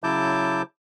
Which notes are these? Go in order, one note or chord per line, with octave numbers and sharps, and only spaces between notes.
C#3 F#3 E4 A5 D6 G6